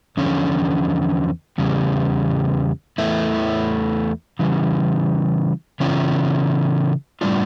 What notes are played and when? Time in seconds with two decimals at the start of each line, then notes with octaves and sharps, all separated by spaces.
0.17 E2 D3 F3 C#4
1.58 E2 C#3 G3
2.98 E2 E3 A3 E4
4.39 C#3 E3 G3
5.80 C#3 E3 C#4 F4
7.21 A2 G3 D4 F4